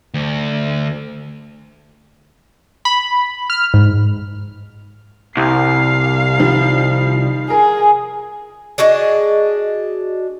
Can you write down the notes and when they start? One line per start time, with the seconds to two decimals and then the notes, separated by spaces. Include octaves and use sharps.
0.14 D2
2.85 B5
3.50 F6
3.74 G#2
5.37 C2 F5 C7
6.39 D#3 F3 G3
7.50 G#4 A#4
8.78 D4 F#4 G#4 D#5